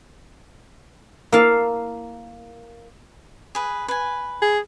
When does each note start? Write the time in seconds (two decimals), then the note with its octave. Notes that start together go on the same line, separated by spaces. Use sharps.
1.32 A#3 E4 A#4 F5 A5
3.55 G#4 B4
3.88 B4 G#5
4.42 G#4